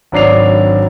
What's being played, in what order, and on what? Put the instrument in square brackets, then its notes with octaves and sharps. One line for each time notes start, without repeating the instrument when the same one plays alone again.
[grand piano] G#1 F#3 D4 C7 F7